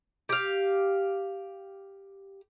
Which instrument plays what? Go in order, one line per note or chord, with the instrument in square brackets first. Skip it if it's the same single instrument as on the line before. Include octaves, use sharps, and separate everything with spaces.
[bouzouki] G4 F5